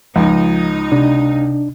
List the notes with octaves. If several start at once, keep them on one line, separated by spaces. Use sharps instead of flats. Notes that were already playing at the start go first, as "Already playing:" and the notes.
C#2 F3 D#4
C3 D4